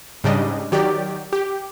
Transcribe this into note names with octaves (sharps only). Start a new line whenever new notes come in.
G#2 C#3 G3 D4 D#5
D#3 F#3 G4 D5
G4